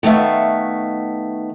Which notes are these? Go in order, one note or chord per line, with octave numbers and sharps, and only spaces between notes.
D#3 A3 B3 E5 F5